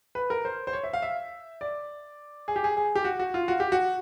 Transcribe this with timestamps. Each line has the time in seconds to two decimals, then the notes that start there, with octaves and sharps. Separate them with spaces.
0.15 B4
0.30 A#4
0.45 C5
0.67 C5
0.73 C#5
0.84 E5
0.93 F5
1.02 E5
1.61 D5
2.48 G#4
2.56 G4
2.64 G#4
2.77 G#4
2.95 G4
3.05 F#4
3.19 F#4
3.34 F4
3.48 F#4
3.60 G4
3.72 F#4